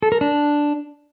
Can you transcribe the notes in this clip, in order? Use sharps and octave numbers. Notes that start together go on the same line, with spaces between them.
A4
A#4
D4